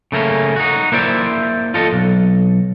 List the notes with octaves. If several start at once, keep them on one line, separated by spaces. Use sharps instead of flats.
C#3 A3 A#3 C#4
D#4 F#4
A#3 E4 C5 D5 E5
F4 A4 D#5
B1